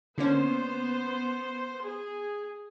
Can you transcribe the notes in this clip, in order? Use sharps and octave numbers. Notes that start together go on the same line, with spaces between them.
D3 A#3 B3 C#4 C5
G#4